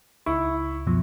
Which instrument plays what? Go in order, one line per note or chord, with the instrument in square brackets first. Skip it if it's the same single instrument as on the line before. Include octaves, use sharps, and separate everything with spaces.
[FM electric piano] C#2 C#6 [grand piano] E4
[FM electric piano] F#2 B2 F3